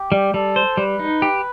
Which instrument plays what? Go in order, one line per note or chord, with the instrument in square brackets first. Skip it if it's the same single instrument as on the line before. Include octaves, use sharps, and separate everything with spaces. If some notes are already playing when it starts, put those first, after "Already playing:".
Already playing: [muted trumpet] G4
[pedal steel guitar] G3
[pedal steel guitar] G3 [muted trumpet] A4
[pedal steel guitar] C5
[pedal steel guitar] G3 [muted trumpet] B4
[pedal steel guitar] D#4
G4